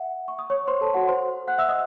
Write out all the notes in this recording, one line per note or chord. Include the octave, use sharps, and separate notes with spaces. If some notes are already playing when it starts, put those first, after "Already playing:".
Already playing: E5 F#5
C#6
D#6
C#5 C#6
C5 C6
A4 A5
F#4 F#5
C5 C6
F#5 F#6
E5 E6
D#5 D#6